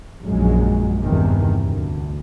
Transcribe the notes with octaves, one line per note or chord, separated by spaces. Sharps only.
A#1 F#2 G#3
E2 G2 C3 D#3
D2